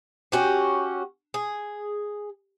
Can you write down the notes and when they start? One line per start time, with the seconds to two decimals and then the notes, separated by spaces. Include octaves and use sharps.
0.32 C#4 F#4 G4
1.34 G#4